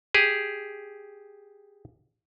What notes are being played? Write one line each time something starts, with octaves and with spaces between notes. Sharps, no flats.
G4 G#4